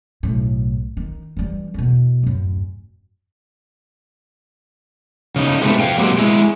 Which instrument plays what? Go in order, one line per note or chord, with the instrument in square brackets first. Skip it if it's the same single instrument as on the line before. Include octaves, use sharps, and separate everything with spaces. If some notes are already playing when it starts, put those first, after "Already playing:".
[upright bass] B1 A2
D#3
E3 G3
E2 B2
D1 F#2
[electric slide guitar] C#3 D#4
C3 G#3 A3 B3
C5 F5 G5
A#2 F#3 G#3 C4 G4
G#3 E4